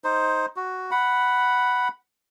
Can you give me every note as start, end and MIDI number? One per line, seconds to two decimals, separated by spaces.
0.04 0.46 63
0.04 0.46 72
0.56 0.91 66
0.91 1.88 78
0.91 1.88 83